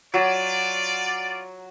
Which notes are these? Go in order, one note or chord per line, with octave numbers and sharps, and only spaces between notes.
F#3 F4 D5